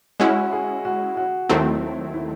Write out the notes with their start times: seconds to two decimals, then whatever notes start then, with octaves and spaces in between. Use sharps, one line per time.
0.20 G#3 C#4 E4 F#4
0.52 G#4
0.85 F#4
1.17 F#4
1.49 D#2 D#3 F#3 A3 C4 E4
2.14 E4